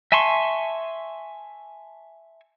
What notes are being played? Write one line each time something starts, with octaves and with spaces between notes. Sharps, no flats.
E5 G#5 A5 C6 C#6